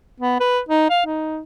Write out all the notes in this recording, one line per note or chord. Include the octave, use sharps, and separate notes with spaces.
B3
B4
D#4
F5
D#4